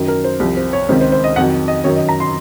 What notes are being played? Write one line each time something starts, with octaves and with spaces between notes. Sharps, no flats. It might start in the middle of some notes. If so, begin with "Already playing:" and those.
Already playing: F#2 D#3 F#3
A#4
C5
C2 C3 F3
C5
C#5
C#2 C3 D#3 C5
C5
C5
D#5
F2 D#3 F#3 F#5
D#5
F#2 D#3 F#3 C#5
D#5
A#5
C6